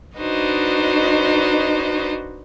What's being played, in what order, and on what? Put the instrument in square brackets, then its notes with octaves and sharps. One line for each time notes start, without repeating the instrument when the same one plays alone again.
[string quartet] D4 D#4 F#4 B4 C5 D#5